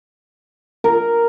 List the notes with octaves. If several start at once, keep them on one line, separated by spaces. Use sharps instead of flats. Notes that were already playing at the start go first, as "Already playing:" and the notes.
A#4